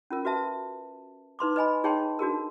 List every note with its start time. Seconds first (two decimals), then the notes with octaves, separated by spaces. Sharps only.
0.10 C#4 F4 A#4
0.25 F#4 B4 E5 A5
1.39 D#4 B4 C6 D6
1.56 B4 D#5 G#5 B5
1.84 D#4 G#4 C#5 G5 A5 C6
2.19 D4 F#4 G#4 A#4